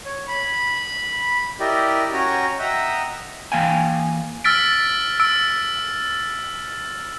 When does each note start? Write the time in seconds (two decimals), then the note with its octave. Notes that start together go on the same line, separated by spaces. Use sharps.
0.06 C#5
0.28 B5
1.60 E4 G4 A#4 D5 D#5 G5
2.13 C#4 F#4 C#5 G5 G#5 A#5
2.59 D#5 E5 F#5 G5 A#5 D#6
3.52 E3 A#3 F5 G5 G#5
4.44 E6 F6 A6 B6 D7
5.20 E6 D7